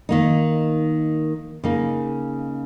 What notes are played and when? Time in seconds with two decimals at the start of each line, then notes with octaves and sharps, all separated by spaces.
0.09 D#3 A#3 D#4
1.64 C#3 A#3 D#4